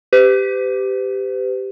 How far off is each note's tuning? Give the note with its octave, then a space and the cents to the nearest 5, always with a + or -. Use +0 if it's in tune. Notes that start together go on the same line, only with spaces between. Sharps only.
G4 +0 B4 +45